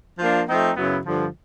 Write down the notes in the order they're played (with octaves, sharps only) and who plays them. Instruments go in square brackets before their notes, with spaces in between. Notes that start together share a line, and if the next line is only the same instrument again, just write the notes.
[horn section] F3 A#3 D4 F4
F3 A3 C4 D#4
F#2 C#3 F#3 B3 E4
G2 D3 F3